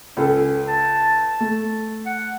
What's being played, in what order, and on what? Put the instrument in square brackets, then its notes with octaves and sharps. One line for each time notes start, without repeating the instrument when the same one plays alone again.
[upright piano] C#2 A4 [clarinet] C#4
[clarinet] A5
[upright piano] A3
[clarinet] F#5